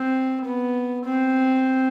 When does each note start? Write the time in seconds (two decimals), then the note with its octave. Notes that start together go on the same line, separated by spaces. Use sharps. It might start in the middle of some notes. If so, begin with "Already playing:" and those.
Already playing: C4
0.45 B3
1.05 C4